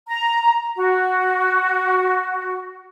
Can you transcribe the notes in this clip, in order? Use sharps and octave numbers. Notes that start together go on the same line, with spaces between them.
A#5
F#4